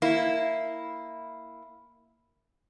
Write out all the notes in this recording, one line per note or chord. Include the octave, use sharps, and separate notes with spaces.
A#3 E4